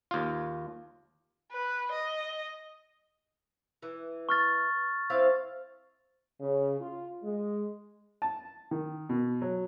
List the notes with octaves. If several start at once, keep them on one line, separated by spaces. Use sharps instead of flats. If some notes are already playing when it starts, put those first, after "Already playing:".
D#2 F4
B4
D#5
E3
C#6 F6 A6
C4 E4 F5
C#3
F4
G#3
A5
D#3
B2
F#3